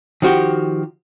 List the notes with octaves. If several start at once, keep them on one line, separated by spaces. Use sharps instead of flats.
D#3 F3 F#4 G4